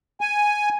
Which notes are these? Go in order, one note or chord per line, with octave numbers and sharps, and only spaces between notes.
G#5